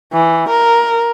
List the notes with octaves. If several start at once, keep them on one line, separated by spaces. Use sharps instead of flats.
E3
A#4